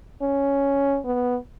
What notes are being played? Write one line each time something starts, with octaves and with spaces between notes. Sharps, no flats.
C#4
B3